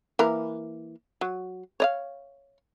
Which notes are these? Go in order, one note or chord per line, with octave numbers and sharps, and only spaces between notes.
E3 A#3 A#4
F#3
C#5 D#5 F5